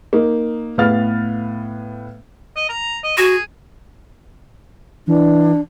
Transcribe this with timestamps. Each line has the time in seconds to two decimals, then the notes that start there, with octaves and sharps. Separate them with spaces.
0.13 A#3 D#4
0.78 A2 B3 B4 F5 F6 A6
2.56 D#5
2.69 A#5
3.03 D#5
3.18 F#4 G#4
5.07 E3 D4